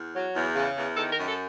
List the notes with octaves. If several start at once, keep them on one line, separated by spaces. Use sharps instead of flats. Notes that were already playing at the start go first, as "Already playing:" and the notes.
Already playing: E2
F#3
E2
C#3
E2
D#3 A4
A#4
F#2
A4